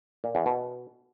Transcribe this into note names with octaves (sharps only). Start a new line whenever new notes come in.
A#2
E2
B2